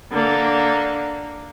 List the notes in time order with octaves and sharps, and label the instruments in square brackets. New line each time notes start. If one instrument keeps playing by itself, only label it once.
[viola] D3 A#3